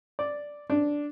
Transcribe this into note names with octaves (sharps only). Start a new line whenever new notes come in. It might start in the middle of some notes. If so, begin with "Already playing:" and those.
D5
D4